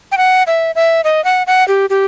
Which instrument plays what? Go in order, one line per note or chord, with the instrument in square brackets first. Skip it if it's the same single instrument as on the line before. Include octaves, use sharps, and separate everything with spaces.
[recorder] G5
F#5
E5
E5
D#5
F#5
F#5
G4
G4